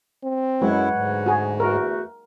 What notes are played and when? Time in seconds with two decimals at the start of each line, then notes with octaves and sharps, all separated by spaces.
0.24 C4
0.62 F#2 F#3 G#3 E4 B4 C#5 F#5
0.95 D2 G#2
1.26 F#4 G#4
1.60 E2 A3 F#4 A#4